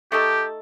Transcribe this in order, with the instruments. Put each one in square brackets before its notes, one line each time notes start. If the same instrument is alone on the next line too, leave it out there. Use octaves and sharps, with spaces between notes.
[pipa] A3 D#4 A4 [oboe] G4